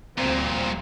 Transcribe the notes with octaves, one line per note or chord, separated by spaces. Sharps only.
D2 G2 A#2 C4